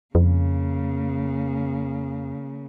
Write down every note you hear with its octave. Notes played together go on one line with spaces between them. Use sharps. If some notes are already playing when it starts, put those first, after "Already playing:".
F2 C#3 A#3